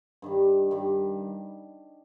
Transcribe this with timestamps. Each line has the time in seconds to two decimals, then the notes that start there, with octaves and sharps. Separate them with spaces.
0.22 G2 D#3 G3
0.71 G2 D#3 G3